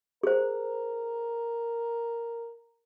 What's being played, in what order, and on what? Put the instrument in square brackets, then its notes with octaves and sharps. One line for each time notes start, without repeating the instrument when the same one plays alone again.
[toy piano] G#4 C5 [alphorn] A#4